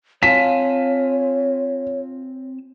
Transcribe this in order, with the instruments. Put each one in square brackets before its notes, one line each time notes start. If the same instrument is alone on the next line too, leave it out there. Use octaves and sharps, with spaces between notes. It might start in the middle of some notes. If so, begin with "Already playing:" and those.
[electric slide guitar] C4 G#5 A5 [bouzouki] F4 [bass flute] C#5 [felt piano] B6